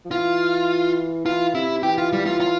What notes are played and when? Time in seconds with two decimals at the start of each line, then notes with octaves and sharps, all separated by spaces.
0.05 F3
0.10 E3 F4
1.25 E3 F4
1.55 C3 E4
1.83 E3 G4
1.98 F4
2.13 G3
2.26 F4
2.40 F4